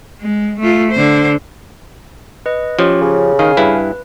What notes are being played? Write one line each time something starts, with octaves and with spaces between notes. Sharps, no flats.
G#3
A3 F4
D3 C5
B4 D#5
F3 C#4 G4 C#5
C#3
D#3 F5 G#5 F6
G2 E4 B4